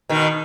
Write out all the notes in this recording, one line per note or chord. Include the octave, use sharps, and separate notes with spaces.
B2 D#3